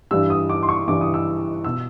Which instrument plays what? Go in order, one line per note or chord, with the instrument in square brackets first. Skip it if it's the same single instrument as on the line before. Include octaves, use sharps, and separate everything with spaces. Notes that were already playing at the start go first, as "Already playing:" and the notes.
[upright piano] G2 E3 G3 E6
D#6
D6
C6
C#6
G2 E3 G3 D6
D#6
E6
B2 E6